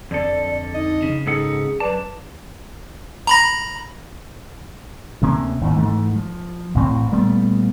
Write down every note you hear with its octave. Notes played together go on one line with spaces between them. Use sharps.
F2 D3 A4 D5
D#4 D#5
C#3
G#2 D#4 G#4 A4 F#5
F#2 B4 D5 A5
A#5 B5 A#6
D2 C3 A#3 C#4
G#1 D#2 A2
G#2 E3 A3
F3
A1 A2 C4
A#2 G3 A3 B3